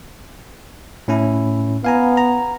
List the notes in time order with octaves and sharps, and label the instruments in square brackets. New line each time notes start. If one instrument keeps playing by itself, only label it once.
[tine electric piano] A2 C#4 E4
[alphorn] B3 [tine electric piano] F5 G#5 A#5
[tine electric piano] A#5